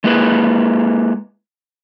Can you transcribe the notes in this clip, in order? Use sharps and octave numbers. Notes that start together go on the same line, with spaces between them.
G#3 A#3 E4 G#4 B4